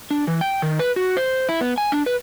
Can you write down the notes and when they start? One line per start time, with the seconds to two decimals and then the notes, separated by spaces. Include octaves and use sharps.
0.11 D4
0.27 E3
0.41 G5
0.62 D#3
0.79 B4
0.96 F#4
1.17 C5
1.49 E4
1.61 B3
1.78 G#5
1.92 D4
2.06 B4